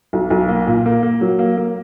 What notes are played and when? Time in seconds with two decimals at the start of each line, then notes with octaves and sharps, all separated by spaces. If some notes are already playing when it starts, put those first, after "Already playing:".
0.13 B1
0.30 B1
0.48 A#3
0.67 A#2
0.86 A#3
1.03 A#3
1.21 F#3
1.39 A#3
1.57 A#3